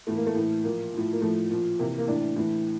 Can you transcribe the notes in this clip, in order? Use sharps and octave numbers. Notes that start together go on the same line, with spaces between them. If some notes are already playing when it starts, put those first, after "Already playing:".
A2 E3 A3
A#3
A3
A2 E3
A#2 F3 A#3
A2 F3
A#3
A2 F3 A3
A#2 F3
C3 E3 A#3
A#3
A2 E3 D4
A2 E3